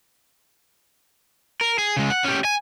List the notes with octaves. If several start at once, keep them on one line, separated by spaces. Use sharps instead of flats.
A#4
G#4
C#3 G#3
F#5
C#4 G4
G#5